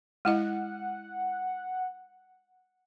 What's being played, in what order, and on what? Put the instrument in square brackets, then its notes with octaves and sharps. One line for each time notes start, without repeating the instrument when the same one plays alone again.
[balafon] G#3 E4 D#5 [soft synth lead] F#5